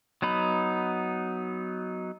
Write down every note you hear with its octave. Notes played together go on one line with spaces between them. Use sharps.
F#3 B3 D#4 B5